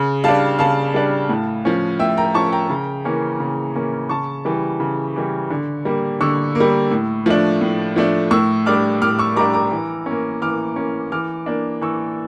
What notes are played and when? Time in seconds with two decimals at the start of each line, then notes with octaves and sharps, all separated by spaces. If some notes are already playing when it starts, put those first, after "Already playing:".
Already playing: C#3
0.24 G3 D4 F5 A5
0.59 C#3 F5 A5
0.94 G3 D4
1.29 A2
1.65 F3 C#4
1.99 A2 E5 G5
2.17 G5 A#5
2.34 F3 C#4 A5 C#6
2.52 G5 A#5
2.70 C#3
3.05 E3 A#3 C#4
3.40 C#3
3.75 E3 A#3 C#4
4.10 C#3 A5 C#6
4.45 E3 G3
4.80 C#3
5.16 E3 G3
5.51 D3
5.85 G3 A#3
6.21 D3 C#6 E6
6.55 A#3
6.60 G3
6.91 A2
7.26 F3 A3 D4
7.61 A2
7.96 F3 A3 D4
8.31 A2 C#6 E6
8.66 G3 D4 D6 F6
9.02 A2 D6 F6
9.19 C#6 E6
9.36 G3 D4 A#5 D6
9.53 A#5 D6
9.71 E3
10.06 A#3 C#4
10.42 E3 D6 F6
10.76 A#3 C#4
11.12 E3 D6 F6
11.46 A#3 D4
11.81 E3 C#6 E6